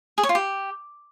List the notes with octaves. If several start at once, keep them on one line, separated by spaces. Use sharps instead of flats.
G#4
C#5
F4
G4